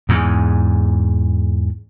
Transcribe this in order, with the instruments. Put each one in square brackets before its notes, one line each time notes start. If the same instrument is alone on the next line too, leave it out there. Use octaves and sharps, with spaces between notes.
[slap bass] E2 G#2